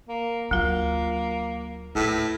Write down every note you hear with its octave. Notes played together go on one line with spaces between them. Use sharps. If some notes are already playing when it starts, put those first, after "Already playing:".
A#3
D2 F#3 A#3 F4
D#1 A2 B4